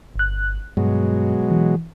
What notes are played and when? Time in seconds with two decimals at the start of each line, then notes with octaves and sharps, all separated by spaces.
0.16 G1 F#6
0.77 G2 B2 F#3 G#3
1.51 E3